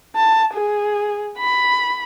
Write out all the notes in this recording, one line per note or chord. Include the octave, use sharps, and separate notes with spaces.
A5
G#4
B5